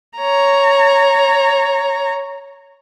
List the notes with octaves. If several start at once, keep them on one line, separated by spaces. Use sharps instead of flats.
C#5 A#5